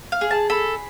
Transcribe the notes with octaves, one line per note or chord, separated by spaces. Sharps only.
F5
G#4
A5
A4 B5